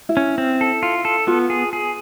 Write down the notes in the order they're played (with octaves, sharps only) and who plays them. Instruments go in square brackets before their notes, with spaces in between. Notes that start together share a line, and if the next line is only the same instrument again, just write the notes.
[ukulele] E4
[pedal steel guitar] C#4
C4
A4
F4
A4
[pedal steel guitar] B3 [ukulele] F4
[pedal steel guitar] G#4
G#4